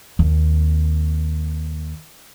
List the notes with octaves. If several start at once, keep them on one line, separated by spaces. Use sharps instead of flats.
D#2 C4